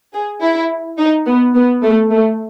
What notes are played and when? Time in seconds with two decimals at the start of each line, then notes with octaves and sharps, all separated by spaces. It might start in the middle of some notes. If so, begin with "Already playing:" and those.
0.14 G#4
0.42 E4
0.98 D#4
1.27 B3
1.55 B3
1.83 A3
2.11 A3